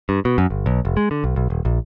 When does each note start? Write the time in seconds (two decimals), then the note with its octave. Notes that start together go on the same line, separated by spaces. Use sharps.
0.09 G2
0.25 B2
0.38 F#2
0.50 G1
0.66 B1
0.85 F1
0.97 G#3
1.11 D3
1.24 B1
1.36 B1
1.50 D#1
1.65 A#1